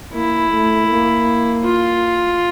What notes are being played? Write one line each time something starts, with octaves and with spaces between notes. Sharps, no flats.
A#3 E4
A3
A#3
F4